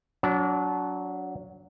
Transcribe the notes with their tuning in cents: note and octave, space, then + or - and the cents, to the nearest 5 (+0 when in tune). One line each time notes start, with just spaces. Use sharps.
F#3 +0 D4 -30